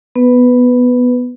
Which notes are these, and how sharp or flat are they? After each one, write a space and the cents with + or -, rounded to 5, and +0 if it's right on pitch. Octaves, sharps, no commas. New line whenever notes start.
B3 +0 B4 +10